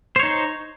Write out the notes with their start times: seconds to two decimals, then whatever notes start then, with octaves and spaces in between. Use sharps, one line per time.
0.16 C5
0.19 C#5
0.23 D#4